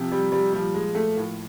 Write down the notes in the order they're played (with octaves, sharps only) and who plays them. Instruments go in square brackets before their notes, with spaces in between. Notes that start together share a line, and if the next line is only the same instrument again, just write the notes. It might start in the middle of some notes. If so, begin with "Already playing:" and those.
Already playing: [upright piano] C3 F3
G3
G3
A#2 F3 G3
G#3
A3
A2 F3 A#3